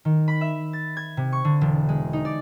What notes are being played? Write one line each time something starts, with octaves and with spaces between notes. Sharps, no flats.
D#3
B5
E5
A6
G#6
C3
C#6
D3
E1
G#3
D#4
D5